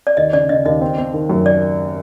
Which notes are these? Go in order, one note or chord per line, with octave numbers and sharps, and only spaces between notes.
D5
D#2 D#5
C#3 D5
C#3 D#5
D#2 D#5
C4
C4
D#3
F#2
D5